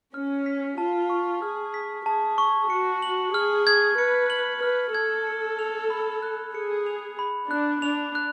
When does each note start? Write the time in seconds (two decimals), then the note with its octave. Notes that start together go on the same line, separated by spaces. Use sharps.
0.14 C#4 F6
0.46 B6
0.78 F4 A5
1.10 C#6
1.42 G#4 F6
1.74 B6
2.06 G#4 A5
2.38 C#6
2.70 F#4 C#7
3.02 F#7
3.34 G#4 F6
3.67 G#6
3.98 B4 C#7
4.30 F#7
4.62 B4 F6
4.94 A4 G#6
5.27 C#7
5.59 F7
5.90 B5
6.22 F#6
6.54 G#4 C#7
6.86 F7
7.19 B5
7.50 D4 F#6
7.82 D4 F7
8.15 F#6